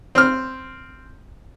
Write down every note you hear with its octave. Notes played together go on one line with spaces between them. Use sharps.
C4 F6